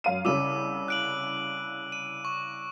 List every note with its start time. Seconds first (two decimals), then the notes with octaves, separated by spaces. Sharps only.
0.04 F#2 F5 D#7
0.25 C2 C#3 D6 E6 D#7
0.88 F#6 D7 F#7
1.92 D#7
2.25 C#6